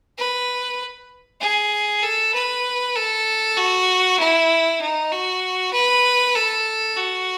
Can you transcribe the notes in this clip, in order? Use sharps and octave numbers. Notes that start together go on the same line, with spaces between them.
B4
G#4
A4
B4
A4
F#4
E4
D#4
F#4
B4
A4
F#4